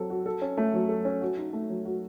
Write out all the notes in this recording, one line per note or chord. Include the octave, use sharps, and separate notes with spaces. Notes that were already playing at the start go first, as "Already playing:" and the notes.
Already playing: F#3 C4 A4
F#4
A4
C#4
A3
F#3
A4
C#4
F#4
D#4
A3
F#3
F#4